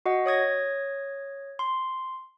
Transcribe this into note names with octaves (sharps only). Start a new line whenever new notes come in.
F#4 D#5 F#5
C#5 D#6 G#6 A#6
C6